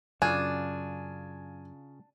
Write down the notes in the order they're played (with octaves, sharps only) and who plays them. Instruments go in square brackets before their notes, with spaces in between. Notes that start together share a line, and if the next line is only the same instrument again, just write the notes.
[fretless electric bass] F#2 [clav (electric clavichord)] C#3 F4 [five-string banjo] D4 [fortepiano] G#5